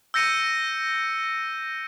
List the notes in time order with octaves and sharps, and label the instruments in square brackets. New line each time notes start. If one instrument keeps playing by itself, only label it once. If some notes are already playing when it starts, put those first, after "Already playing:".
[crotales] E6 G6 A#6 C#7 D#7